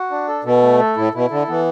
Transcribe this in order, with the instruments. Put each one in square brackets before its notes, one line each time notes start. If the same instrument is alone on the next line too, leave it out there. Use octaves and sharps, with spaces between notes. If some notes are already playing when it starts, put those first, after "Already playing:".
Already playing: [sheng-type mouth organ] F#4
D4
A4
[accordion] B2 [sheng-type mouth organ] A4
[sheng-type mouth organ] A3
A4
[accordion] A2 [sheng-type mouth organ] E4
[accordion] B2 [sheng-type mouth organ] E4
[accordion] D3 [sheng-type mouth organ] A4
[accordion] E3 [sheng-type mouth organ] B3